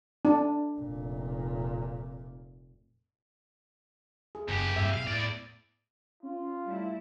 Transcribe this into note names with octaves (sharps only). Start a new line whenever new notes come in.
D4
F1 A#2
G#4
F#1 F2 G4
G2 A#2 F#3 E5
B2 F5
E2 A2 D5
C#4 F4
G3 A3 E4